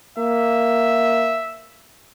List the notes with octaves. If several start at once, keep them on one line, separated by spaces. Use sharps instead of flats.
A#3 E5